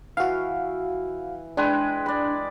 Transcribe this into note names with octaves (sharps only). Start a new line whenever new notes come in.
E3 F#4 F5
G#3 D4 B4 G5
D5 B5